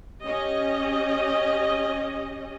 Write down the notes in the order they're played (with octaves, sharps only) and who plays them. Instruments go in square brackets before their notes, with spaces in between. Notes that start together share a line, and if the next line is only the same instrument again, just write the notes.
[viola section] C#4 G4 D#5